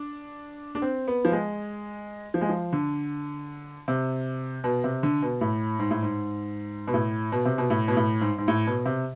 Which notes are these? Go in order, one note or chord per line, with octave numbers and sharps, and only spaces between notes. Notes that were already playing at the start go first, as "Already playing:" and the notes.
Already playing: D4
D4
C4
B3
F3
G#3
F3
G#3
F3
D3
C3
B2
C3
D3
B2
A2
G#2
A2
G#2
B2
A2
B2
C3
B2
A2
B2
A2
G#2
G#2
A2
B2
C3